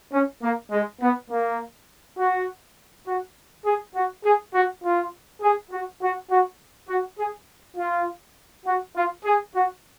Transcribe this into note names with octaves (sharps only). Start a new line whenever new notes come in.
C#4
A#3
G#3
B3
A#3
F#4
F#4
G#4
F#4
G#4
F#4
F4
G#4
F#4
F#4
F#4
F#4
G#4
F4
F#4
F4
G#4
F#4